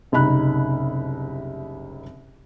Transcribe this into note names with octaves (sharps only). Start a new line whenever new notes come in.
F#1 C2 D#4 B5 F#6